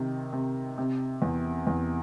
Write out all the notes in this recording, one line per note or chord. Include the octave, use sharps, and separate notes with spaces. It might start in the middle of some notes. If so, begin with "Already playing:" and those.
Already playing: C3 D#3
C3
C3
E2
E2